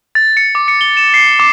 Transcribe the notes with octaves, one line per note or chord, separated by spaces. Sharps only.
A6
C#7
D6
C#7
G7
E7
C7
D6